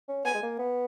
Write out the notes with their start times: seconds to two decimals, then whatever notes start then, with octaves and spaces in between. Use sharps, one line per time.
0.08 C#4
0.25 B3 G#5
0.35 G#3
0.43 A#3
0.59 B3